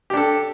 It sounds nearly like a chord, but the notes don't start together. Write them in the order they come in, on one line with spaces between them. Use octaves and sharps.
G4 D4 A4